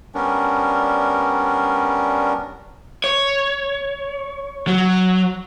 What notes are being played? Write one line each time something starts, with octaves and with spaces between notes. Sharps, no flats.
G3 B3 C#4 D4 A#4
C#5
F#3